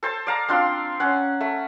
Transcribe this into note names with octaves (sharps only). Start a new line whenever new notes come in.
A4 C5 A5
D5 F5 A#5
C4 D4 F4 C6
C#4 F#5
A3